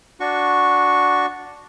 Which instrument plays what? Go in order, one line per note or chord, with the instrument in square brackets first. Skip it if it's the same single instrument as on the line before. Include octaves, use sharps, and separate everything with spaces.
[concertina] D4 F#4 C#6